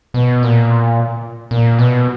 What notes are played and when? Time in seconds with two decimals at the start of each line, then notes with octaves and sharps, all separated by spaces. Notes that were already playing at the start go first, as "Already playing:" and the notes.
0.14 B2
0.43 A#2
1.51 A#2
1.79 B2